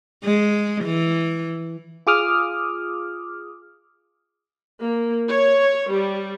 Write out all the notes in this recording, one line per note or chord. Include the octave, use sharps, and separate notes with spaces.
G#3
E3
F4 G#4 D6 D#6 F6
A#3
C#5
G3